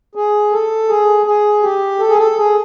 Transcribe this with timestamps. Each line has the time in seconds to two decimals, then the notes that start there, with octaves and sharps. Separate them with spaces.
0.15 G#4
0.52 A4
0.89 G#4
1.26 G#4
1.63 G4
1.99 A4
2.09 G#4
2.18 A4
2.37 G#4